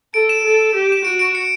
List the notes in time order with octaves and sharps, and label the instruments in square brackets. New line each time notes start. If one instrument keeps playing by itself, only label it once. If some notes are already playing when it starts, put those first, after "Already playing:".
[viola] A4 [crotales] D7
[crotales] E7
[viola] A4
G4
[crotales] E7
[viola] F#4 [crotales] D7
[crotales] D7
C#7